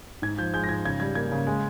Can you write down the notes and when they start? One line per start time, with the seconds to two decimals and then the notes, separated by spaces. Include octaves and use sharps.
0.22 G#2 G#6
0.38 F3 G6
0.54 G#3 G6
0.64 A#6
0.69 G#2 G#6
0.85 C#3 G#6
1.00 G3 G#6
1.15 A#3 G#6
1.32 C#3
1.47 G#3